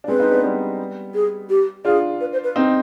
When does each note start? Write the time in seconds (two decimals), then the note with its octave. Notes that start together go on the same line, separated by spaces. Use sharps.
0.04 D4
0.08 G#3 C4 B4
0.20 C4 D#4
0.32 B3 D4
0.43 G3 B3
1.14 G#4
1.50 G4
1.85 D4 F4 G#4
2.21 B4
2.33 C5
2.44 B4
2.56 C4 D#4